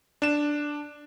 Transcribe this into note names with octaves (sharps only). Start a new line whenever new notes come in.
D4 E7